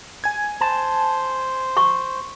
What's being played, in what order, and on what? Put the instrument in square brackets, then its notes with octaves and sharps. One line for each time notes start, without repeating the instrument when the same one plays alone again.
[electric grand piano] G#5 G#6
[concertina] C5 [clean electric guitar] A5
[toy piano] C#6